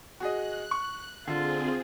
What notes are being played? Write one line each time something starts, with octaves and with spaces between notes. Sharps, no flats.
F#4 G#4 D#5 F#6
C#6
D3 C4 F4 G#4